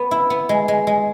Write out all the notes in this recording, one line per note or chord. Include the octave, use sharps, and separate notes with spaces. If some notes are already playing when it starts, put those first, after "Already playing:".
Already playing: B3
E4
B3
G#3
G#3
G#3